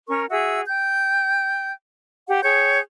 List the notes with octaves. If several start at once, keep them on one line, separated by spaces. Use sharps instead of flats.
C#4 A#4 C#6
F#4 G#4 E5 E6
G5 G6
G4 F#5
G#4 C#5 G5 G6